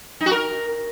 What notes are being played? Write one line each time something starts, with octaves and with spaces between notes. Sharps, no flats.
D#4
F#4
A#4